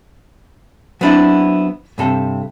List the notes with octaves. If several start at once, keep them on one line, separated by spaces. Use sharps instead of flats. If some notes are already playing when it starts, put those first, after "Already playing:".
F#3 B3 C4 D4 E4
G2 C3 A4